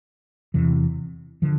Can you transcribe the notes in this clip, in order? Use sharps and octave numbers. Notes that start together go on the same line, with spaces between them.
E2 C3 E3
D3 F3